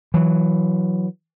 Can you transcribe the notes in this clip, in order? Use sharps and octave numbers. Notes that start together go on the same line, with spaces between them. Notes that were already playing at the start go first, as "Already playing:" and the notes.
E3 F#3